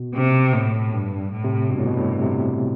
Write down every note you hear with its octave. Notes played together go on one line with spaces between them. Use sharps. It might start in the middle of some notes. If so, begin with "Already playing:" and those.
Already playing: B2
C3
A2
G2
A2
C3
G2 B2
A2
B2
A2
C3